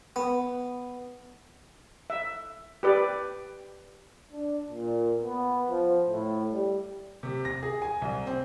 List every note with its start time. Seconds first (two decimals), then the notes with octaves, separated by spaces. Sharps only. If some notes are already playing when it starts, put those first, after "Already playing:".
0.16 B3
2.10 E5
2.83 G4 B4 D5
4.32 D4
4.70 A#2
5.23 B3
5.68 F3
6.10 A2
6.52 G3
7.23 C3
7.45 A#6
7.63 G#4
7.82 G#5
8.02 C2
8.27 C4